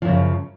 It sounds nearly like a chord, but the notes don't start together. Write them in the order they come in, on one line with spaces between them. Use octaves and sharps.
F3 F#2 C#3